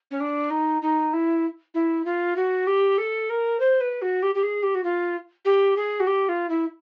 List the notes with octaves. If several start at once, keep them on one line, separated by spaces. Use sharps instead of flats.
C#4
D4
D#4
D#4
E4
E4
F4
F#4
G4
A4
A#4
C5
B4
F#4
G4
G4
G#4
G4
F#4
F4
G4
G#4
F#4
G4
F4
E4